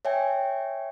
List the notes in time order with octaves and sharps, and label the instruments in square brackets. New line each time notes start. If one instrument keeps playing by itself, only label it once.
[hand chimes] C#5 E5 G5 G#5